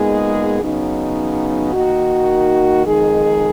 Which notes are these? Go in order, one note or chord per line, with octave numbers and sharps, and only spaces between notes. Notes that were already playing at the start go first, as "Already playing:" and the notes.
Already playing: A#2 G#3 B3 D#4 G#4
C#3 F#3 B3 D#4
D#3 A#3 D#4 F#4
F2 D#3 G#3 D#4 G#4